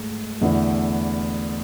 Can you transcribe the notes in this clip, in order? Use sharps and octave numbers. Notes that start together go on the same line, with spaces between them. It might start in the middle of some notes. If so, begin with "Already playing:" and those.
Already playing: G#2 A3
E2 D3 A3 E4